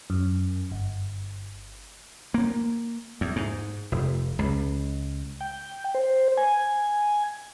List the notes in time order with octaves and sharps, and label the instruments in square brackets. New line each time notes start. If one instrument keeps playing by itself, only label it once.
[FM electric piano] F#2
G1
[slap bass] A#3
E2
G#2
F1
C#2
[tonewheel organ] G5
C5
G#5